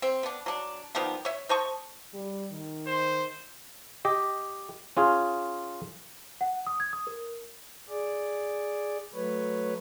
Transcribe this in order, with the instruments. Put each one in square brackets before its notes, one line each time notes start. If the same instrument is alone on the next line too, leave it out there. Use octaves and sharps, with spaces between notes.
[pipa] C4
B3 D4
F#3 D4
D#3 F3 G3 B3
C#5 E5
C5 D#5 A5 C#6
[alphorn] G3
D#3
[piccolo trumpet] C5
[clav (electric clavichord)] G4 D#5
C#4 F4 G#4
[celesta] F#5
D#6
G#6
D#6
A#4
[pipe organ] G#4 D5
F#3 A3 B4 C#5